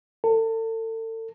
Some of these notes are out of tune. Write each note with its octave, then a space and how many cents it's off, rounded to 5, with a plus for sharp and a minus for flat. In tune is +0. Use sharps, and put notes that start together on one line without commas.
A4 +35